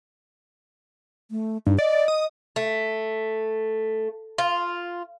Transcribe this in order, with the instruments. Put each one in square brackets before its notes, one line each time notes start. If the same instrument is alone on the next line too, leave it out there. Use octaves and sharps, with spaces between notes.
[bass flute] A3
[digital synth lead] G2 [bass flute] D#4
[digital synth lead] D5 [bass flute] D#5
[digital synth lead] D#6
[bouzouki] A3
F4